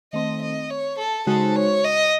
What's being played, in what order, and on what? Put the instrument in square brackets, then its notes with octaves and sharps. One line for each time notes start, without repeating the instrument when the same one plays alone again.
[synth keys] D#3 A3 C4 [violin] D#5
[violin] D#5
C#5
A4
[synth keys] C#3 G#3 D#4 F#4 C5 [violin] A4
[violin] C#5
D#5